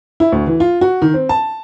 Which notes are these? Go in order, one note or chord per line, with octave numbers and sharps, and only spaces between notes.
E4
D2
E3
F4
F#4
D#3
C4
A5